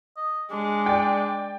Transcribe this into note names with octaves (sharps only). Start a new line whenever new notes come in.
D#5
G#3 D4
D5 G5